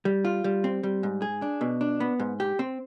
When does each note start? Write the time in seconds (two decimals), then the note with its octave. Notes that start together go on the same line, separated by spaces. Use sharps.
0.05 G3
0.25 F4
0.44 G3
0.64 C4
0.83 G3
1.03 G#2
1.22 G#4
1.42 D4
1.61 B2
1.81 D4
2.00 B3
2.20 G#2
2.40 G4
2.59 C4